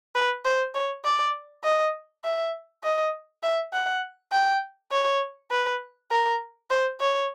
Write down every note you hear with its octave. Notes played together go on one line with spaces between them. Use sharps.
B4
C5
C#5
D5
D#5
E5
D#5
E5
F#5
G5
C#5
B4
A#4
C5
C#5